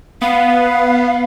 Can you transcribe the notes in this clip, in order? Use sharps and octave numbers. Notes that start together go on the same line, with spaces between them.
B3 F5